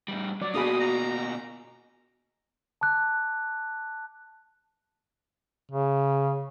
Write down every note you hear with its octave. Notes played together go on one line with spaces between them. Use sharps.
A2 G3
F#3 D5 D6
B2 A#3 D4 F#4 G#4 B5 D#6
A#5
A5 D6 F#6
C#3